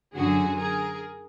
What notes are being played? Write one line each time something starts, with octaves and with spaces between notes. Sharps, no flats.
F#2 D3 F#3 F#4 G#4
G#4 A#4